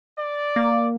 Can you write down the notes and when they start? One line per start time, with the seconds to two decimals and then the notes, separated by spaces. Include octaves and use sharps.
0.18 D5
0.56 A#3